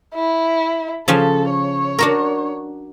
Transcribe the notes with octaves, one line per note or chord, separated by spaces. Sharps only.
E4
C#3 F3 C#4 A4
C#5
D4 F#4 A#4